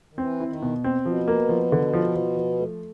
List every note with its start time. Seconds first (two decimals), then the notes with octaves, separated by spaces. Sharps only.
0.13 D#3
0.18 E3 C4
0.40 E4
0.47 D#3
0.62 B2
0.84 C4
1.05 B2 F3
1.28 A#3
1.49 F3
1.72 D3
1.93 F3
2.15 F3
2.37 F3
2.59 A3